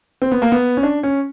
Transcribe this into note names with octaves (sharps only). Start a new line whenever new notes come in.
C4
B3
A#3
B3
C#4
D4
C#4